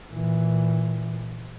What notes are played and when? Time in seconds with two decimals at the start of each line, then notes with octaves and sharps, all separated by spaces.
0.13 A#2 E3